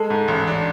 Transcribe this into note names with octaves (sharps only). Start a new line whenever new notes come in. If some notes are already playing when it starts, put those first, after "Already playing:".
Already playing: G#3 A4 A5
G#2
A1
D4